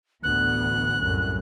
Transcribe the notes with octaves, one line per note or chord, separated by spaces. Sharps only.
A1 D2 B3 F#6
C2 F#2 A2